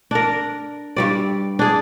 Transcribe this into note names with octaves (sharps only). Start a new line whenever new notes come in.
D4 A#4
G2 G3 D5
D4 G#4